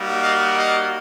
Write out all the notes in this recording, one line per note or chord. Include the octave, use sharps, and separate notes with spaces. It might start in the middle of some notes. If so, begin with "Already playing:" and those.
Already playing: G3 A#3 D#4 F#4
D#5 F5
D#5 F5